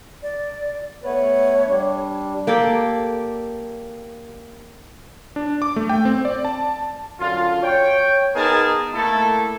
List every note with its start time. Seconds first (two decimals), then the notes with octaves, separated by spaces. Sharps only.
0.23 D5
1.04 A3 B3 B4 C#5
1.67 G3 D4
2.47 A#3 G4 A4 D5
5.36 D4
5.62 D6
5.76 A3
5.89 G5
6.05 C4
6.25 D5
6.45 A5
7.20 F#2 D3 F4
7.62 C#5 G5
8.36 B3 D#4 G#4 A#4 A5
8.93 A3 A#3 E4 A4